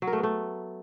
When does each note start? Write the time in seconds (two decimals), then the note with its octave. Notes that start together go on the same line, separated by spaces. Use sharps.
0.02 F#3
0.07 A#4
0.13 A3
0.18 B3
0.23 A3